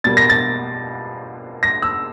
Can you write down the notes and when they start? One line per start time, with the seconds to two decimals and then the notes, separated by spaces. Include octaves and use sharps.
0.04 B2 G3 A#3 A6
0.17 A#6
0.30 A6
1.63 A#6
1.82 E6